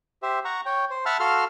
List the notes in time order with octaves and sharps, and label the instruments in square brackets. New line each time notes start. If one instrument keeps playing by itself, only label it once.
[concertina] G4 C5 E5
F#5 A#5 C#6
C#5 G5
C5
E5 F#5 A5 B5 E6 F6
F#4 A4 F5 C6 E6 F6